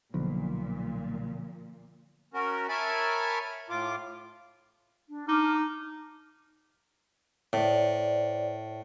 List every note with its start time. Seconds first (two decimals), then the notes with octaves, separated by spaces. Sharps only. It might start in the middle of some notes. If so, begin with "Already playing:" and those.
0.14 B1 A#2 D3 F3
2.34 C#4 F#4 A#4
2.69 A#4 C#5 E5 G#5 A5 B5
3.70 A2 F4 D6
5.08 D4
5.28 D#4 A5 D6 F6
7.53 A2 C5 D5